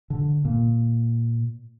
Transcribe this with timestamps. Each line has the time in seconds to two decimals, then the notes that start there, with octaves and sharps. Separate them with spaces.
0.10 D3
0.45 A#2